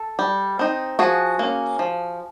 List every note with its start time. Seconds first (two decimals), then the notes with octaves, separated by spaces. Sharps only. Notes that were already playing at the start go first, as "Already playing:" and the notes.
Already playing: A4
0.19 G3
0.59 C4 D#4
0.99 F3 F#4 G#4
1.39 A#3 C#4
1.79 F3